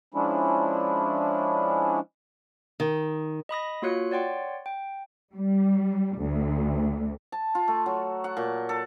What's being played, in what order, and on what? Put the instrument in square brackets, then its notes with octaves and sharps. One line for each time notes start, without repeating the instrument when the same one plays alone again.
[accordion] F3 G#3 C#4 D4 E4
[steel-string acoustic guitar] D#3
[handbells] D#5 B5 D#6 A#6
A#3 F4 F#4 C#5 F#6 C#7
C#5 D5 F#5 G5 C6
G5
[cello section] G3
D2
[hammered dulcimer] A5
F4
A3
F#3
F#5
A#2
A4